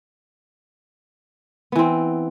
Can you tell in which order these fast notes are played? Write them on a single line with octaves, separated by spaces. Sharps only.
B3 E3 C4